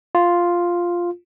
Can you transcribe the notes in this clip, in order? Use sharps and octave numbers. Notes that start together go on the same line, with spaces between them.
F4